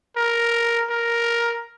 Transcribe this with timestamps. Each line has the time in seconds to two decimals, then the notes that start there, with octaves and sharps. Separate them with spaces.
0.17 A#4
0.90 A#4